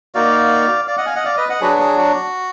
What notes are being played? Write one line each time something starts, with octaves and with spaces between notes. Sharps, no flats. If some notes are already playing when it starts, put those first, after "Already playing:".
A#3 D#4 F#4 D5 F5
D5 F5
D#5 F#5
F5 G#5
D#5 F#5
D5 F5
B4 D#5
D#5 F#5
F#3 D4 F#4 G#4 B4
G#4
F#4